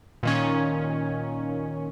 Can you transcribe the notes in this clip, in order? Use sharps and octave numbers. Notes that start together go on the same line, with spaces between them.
A#2 D#3 C#4